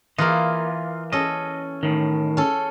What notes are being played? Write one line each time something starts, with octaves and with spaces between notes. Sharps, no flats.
E3 A#3 F4 D#5
C#4 A4 D#5
A2 D#3
C#4 A4